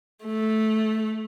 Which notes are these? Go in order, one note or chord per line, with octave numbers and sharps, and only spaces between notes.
A3